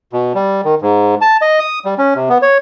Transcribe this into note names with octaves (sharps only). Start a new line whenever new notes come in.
B2
G3
D#3
G#2
A5
D#5
D#6
G3
C#4
C3
B3
C#5